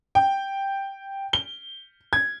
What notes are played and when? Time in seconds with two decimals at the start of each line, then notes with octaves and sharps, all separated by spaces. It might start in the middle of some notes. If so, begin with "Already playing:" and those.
0.15 G5
1.33 G7
2.13 G#6